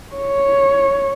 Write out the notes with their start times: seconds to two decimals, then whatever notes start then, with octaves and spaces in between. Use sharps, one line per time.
0.16 C#5